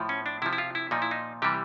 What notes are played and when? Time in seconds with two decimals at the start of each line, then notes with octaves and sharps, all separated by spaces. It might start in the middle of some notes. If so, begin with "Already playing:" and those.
Already playing: A2 F3
0.09 C#4
0.26 D4
0.42 C3 E4
0.46 F3
0.53 E4
0.58 F4
0.75 E4
0.91 A#2 F3 D#4
1.02 E4
1.11 D#4
1.42 C3 E3 G3 G4